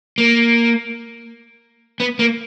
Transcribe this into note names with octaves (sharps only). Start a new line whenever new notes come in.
A#3
B3
A#3